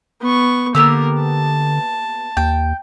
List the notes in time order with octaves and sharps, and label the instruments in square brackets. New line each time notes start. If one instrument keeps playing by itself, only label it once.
[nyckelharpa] B3 C#6
[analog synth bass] D3 [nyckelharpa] A#3 A#4 [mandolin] B3 G4 E6
[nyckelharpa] A5
[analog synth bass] D#2 [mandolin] G5